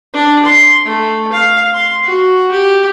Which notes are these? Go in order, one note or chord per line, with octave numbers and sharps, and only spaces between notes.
D4
C6
A3
F5
C6
F#4
G4